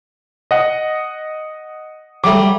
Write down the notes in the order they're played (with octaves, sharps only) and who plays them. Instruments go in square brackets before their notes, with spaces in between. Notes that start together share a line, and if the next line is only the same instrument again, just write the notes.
[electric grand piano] D#5 F#5
[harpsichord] F#3 G3 A3 [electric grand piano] D6